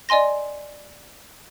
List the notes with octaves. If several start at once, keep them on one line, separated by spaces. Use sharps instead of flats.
D5 D#5 G#5 C6 A#6